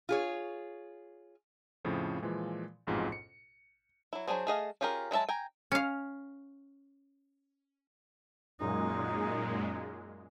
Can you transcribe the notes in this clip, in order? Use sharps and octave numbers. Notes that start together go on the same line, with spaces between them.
F4 G#4 C#5
F2 A2 C#3 F3
A#2 E3 F3 G#3
A1 F2 G#2 B2 F4 G#4
C#7
F#3 E4
F#3 C#4 D4 G#4 C5
A3 G#4 D#5 F5
C#4 F4 G4 G#4 A#4
F#3 G#3 B3 E5 A5
G5 G#5 A#5
C#4 F5
F#2 A#2 G#3 D#4